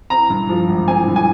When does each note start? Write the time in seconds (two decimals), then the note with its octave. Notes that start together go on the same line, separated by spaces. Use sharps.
0.10 C4 A#5
0.30 G2
0.49 F3
0.69 G#1
0.88 C4 G#5
1.07 G2
1.16 G#5